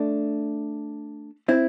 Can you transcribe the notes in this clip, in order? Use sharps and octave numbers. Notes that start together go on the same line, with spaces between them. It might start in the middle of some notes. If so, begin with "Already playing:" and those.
Already playing: A3 D4
C4 E4